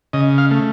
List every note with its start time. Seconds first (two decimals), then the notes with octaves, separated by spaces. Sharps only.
0.13 C#3 D#5
0.38 F5
0.51 A3